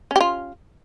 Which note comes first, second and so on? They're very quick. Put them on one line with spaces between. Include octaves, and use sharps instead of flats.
C#4 G4 F4